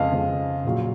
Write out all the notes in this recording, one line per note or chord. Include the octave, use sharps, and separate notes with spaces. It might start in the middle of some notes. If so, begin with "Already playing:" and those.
Already playing: F2 C#3 G#3 D#5 F5
F2 C#3 G#3
A#1 A#2 F#3